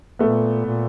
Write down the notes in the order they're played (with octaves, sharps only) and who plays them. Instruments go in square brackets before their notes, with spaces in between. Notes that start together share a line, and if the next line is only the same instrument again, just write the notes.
[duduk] A#2 [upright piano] A3 B3
[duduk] A#2